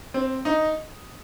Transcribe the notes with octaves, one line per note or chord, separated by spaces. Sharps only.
C4
D#4